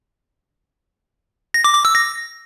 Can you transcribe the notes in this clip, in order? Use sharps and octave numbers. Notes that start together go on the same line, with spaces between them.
A#6
D6
D6
E6
A#6